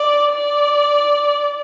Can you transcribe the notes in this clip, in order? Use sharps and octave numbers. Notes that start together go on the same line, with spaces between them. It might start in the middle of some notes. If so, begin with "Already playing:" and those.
Already playing: D5
D5